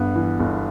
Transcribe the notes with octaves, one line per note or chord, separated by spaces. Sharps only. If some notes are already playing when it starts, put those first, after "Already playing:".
Already playing: G1 G2 B3
E3
G1